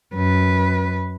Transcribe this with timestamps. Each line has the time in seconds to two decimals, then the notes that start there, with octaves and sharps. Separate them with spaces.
0.14 F#2 B4